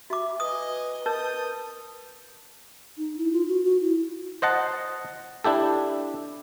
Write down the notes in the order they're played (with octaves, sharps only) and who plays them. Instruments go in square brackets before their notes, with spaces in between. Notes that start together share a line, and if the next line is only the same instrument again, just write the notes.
[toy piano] F#4 D6 [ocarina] E5
[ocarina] B4 [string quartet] D#5 G#5 [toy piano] D#6
[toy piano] A#4 [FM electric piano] A5 G6 [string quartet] D#6
[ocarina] D#4
E4
F4
F#4
F#4
E4
[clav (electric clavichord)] C5 D#5 F#5 A5
D4 E4 G4 A4